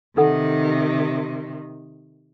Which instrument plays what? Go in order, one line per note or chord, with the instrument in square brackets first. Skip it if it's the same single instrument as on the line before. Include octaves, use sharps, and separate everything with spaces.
[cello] C3 D#3 [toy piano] D#4 A4 F#5